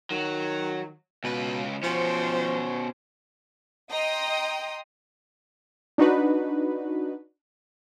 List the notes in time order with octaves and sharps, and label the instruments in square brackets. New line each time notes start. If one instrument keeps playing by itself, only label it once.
[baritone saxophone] D#3 [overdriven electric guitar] F#3
[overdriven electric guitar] C#2 B4 [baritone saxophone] B2
[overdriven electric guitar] B2 C#4 [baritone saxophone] F3 [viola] C5
[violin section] D#5 G5 A#5 C6 D#6
[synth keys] D4 D#4 F#4 B4